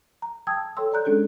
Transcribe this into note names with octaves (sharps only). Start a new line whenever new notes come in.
A#5
G5 A5 D#6 E6 G#6
A4 C#5 G5 C6 E6
A4 D5 A#5 F#6 G6
G#3 C#4 D4 G#4 A4